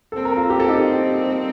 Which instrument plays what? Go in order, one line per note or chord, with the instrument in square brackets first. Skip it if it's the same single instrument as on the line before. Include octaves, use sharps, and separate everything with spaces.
[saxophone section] A#2 G3 C4 [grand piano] A4
[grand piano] A#4
F4 A4
G4
A4
D#4 G4